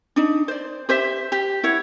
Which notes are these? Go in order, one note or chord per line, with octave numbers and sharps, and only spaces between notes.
D4 D#4
C5 D5
G4 C5 E5
G4
E4 C#5 F#5